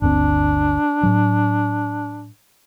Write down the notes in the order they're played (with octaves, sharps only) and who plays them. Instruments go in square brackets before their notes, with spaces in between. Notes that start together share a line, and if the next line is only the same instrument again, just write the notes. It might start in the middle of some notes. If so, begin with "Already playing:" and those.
[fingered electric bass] G1 D2 C4 [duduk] D4
[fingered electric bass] A2 F#3